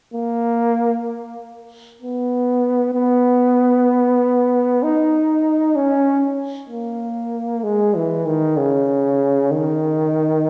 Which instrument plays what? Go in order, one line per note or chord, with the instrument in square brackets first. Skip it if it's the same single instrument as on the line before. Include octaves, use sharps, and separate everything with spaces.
[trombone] A#3
B3
B3
D#4
C#4
A#3
G#3
E3
D#3
C#3
D#3